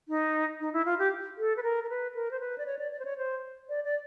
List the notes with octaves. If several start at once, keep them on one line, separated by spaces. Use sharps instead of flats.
D#4
D#4
E4
F4
G4
A4
B4
A#4
A#4
B4
A#4
C5
B4
D5
C#5
D5
D5
C5
C#5
C5
D5
D5